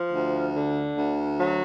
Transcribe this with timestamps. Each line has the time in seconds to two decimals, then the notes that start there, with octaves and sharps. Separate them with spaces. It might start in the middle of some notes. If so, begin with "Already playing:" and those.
Already playing: F3
0.13 D2
0.55 D3
0.96 D2
1.37 F#3